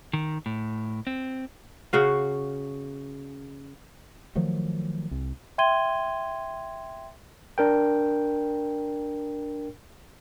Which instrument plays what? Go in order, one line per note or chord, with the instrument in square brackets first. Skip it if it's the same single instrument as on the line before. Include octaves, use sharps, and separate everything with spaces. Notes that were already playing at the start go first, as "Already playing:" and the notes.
[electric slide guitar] D#3
A2
C4
[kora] C#3 F#4 F5
[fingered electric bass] D#3 F3 F#3 A3
C2
[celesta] E5 G5 C6 G#6 D#7 G7
[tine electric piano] D4 A#4 G5